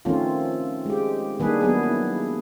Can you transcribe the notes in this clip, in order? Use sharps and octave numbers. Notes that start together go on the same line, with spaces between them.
D#3 F3 A3 C4 C#4 F4
G#3 G4
D#3 G3 A#3 D4 G#4 B4
F#3 B3 G#4
E4